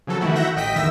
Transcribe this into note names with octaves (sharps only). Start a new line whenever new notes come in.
C#3 F3 F#3 A4
D#3 E3 A3 E4 F#4
E5 F#5 G6 A#6
A1 D#5 G5 B6
E2 D#3 E5 E6 A#6 B6